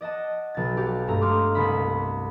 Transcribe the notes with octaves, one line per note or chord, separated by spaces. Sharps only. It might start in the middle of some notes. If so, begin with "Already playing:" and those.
D5 D#5 F#5 A5
B1 A6
F#4 G4 D5 F5
G2 G#3 A3 A#5
C6 D6 D#6 F6 C7
C2 B3 D5 B5 D#6